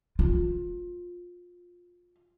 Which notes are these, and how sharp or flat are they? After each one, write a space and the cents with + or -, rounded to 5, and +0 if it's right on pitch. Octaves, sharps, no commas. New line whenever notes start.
F4 +20